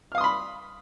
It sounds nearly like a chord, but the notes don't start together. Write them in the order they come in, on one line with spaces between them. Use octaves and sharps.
F6 F5 D#6 C6 B5